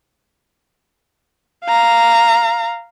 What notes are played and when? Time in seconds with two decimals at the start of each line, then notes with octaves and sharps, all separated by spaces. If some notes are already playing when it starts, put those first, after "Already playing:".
1.65 F5 A#5